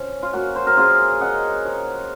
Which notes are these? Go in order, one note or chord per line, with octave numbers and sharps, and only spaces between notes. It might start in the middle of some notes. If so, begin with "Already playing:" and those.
Already playing: F3 C#4
F4
A#3 F#4
C5
A#4
C#4 F4 G#4
C#4 D#5 F#5
F3